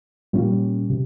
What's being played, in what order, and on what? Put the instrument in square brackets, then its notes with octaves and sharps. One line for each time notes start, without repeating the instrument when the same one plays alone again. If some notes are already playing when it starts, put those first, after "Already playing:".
[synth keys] A#2 G3 A#3 C#4
C3